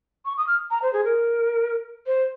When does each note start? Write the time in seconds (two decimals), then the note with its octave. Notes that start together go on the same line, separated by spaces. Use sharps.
0.25 C#6
0.37 D#6
0.47 F6
0.70 A#5
0.82 C5
0.93 G#4
1.04 A#4
2.06 C5